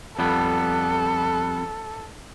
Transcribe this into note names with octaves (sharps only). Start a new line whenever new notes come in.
F2 G3 B3 A4